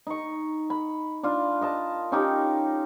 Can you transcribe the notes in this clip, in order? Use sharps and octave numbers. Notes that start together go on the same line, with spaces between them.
D#4 C#6
B5
D4 F4
A#4 D#5 A5
C#4 D#4 G4